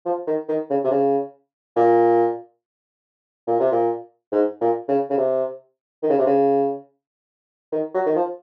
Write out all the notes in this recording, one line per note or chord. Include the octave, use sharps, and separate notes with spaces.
F3
D#3
D#3
C#3
C3
C#3
A#2
A#2
C3
A#2
G#2
A#2
C#3
C#3
C3
D#3
C#3
C3
C#3
D#3
F#3
D#3
F3